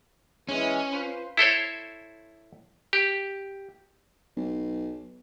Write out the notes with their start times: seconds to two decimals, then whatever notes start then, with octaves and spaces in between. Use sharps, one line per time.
0.49 E3 G#3 C#4
0.92 F4 B4 C5
1.37 E4 A4 C5 C#5
2.93 G4
4.36 B1